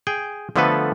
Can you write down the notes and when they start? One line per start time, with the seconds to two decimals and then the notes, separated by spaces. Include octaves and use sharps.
0.07 G#4 G5
0.56 D3 F3 A3 B3 A4 B4